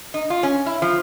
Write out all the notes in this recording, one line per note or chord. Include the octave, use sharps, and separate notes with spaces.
D#4
F4
C#4
E4
F3